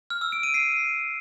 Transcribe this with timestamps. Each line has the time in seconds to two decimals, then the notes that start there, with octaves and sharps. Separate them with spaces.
0.10 F6
0.21 E6
0.32 D7
0.43 D#7
0.54 C7